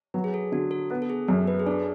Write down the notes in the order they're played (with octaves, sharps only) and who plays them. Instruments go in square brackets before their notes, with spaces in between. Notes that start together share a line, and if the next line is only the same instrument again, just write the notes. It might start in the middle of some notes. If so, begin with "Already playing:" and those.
[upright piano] F#3 [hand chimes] B4
[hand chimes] G#4
A4
[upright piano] D3 [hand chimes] F#4
[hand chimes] A4
[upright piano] B3 [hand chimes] A4
[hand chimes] A4
G#4
[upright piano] F#2 [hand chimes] A4
[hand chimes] B4
G#4
[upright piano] D4 [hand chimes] A4